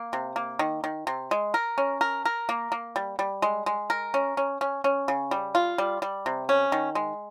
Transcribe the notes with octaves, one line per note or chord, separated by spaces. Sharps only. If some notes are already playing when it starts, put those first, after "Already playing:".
Already playing: A#3
C3
A#3
D#3
D#3
C3
G#3
A#4
C#4
A#4
A#4
A#3
A#3
G3
G3
G#3
G#3
A#4
C#4
C#4
C#4
C#4
C#3
G3
F4
G3
G3
C3
C#4
D#3
G#3